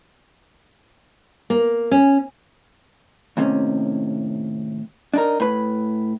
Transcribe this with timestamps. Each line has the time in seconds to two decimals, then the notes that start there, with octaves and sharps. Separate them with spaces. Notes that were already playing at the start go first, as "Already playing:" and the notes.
1.50 A#3
1.91 C#4
3.37 D#2 A2 C3 C#4
5.14 D4 D#4 A#4
5.40 A2 B4